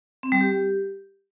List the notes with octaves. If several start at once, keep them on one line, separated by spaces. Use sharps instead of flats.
C4
G3
G4